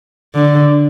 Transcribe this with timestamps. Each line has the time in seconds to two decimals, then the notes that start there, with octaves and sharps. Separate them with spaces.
0.35 D3